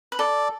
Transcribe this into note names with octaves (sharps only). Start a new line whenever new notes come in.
B4
A4 D5